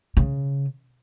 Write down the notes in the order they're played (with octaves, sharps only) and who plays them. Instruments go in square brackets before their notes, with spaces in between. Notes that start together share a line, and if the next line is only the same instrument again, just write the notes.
[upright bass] C#3